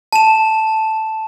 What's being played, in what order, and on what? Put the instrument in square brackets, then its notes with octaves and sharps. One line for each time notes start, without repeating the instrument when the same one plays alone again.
[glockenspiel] A5 E7